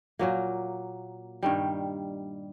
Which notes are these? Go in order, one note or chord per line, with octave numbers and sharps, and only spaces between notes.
A#2 F#3 A#3
G2 D#3 G3